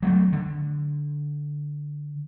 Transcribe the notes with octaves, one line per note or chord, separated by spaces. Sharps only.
F#3 G3 A3
D3